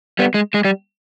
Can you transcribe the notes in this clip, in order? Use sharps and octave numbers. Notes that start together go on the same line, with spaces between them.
G3 B3
G#3
G#3
G3